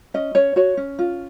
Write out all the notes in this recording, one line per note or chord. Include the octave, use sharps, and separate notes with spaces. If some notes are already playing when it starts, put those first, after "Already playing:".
C#4 D#5
C#4 C#5
F#4 C#5
C#4
F4